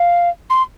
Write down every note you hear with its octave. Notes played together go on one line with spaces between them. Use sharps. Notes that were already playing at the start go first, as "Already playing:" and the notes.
Already playing: F5
C6